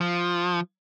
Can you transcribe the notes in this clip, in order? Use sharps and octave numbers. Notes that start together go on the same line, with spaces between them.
F3